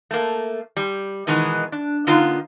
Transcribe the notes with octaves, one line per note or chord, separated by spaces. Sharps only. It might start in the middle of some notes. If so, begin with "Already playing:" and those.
A3 A#3
G3
B2 D#3 E3 G#3 B3
D4
D3 A#3 B3 D#4 F4